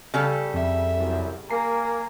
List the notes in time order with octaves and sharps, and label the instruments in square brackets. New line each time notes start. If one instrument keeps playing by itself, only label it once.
[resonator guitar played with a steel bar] C#3 G3 A4
[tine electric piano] F2 [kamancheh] E5
[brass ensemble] C2 F#2
[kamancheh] A#3 [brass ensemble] A#4 G#5 [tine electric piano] A#5 C7